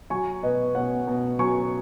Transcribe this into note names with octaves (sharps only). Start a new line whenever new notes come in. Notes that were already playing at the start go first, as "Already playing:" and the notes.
F#3 G#5 C#6
B2 B4 D#5
B2 C#5 F#5
B2
F#3 G#5 C#6